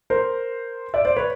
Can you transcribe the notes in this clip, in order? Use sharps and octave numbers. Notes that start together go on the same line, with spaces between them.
A#4 C5
D5 E5
C5 D5
B4 C#5